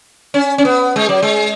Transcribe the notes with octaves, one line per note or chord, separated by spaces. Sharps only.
C#4
C#4
B3
G#3
F#3
G#3